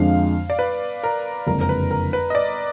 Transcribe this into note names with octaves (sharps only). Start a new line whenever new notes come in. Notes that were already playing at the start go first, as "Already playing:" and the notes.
Already playing: F2 D3 F3 G#3 D4 F5
D5
B4
A#4
F#1 F2 D3 G#3 D4 A#4
A#4
B4
A#4
B4
D#5
D5